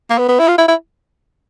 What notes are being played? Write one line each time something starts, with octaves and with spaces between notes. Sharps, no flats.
A#3
B3
B3
E4
F4
E4
E4